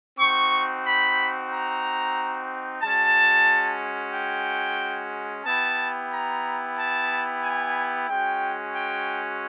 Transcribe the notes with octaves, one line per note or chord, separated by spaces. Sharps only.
C4 D#4 F#4 C#6
B5
A#5
G#3 C#4 F#4 A5
G5
B3 E4 G4 A5
A#5
A5
G#5
G#3 C#4 F#4 G5
G5